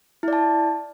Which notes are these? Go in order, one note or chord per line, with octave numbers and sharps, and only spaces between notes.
E4 D5 A5